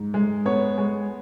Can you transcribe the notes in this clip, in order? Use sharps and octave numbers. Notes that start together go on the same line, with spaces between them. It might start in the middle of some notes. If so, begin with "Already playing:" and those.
Already playing: G#2
G#3
B3 C#5
G#3